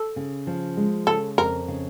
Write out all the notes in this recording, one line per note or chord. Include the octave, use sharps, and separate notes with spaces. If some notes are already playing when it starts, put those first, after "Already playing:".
Already playing: A4
C#3
F3
G#3
C#3 A4
F2 A#4
C#3